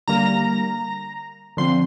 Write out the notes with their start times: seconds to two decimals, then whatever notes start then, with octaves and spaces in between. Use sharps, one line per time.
0.08 D3 G3 A#3 A#5
1.57 D3 F3 C4 C6